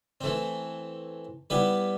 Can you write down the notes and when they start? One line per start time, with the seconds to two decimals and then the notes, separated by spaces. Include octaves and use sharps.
0.21 E3 A3 C4
1.50 G3 B3 E4 B4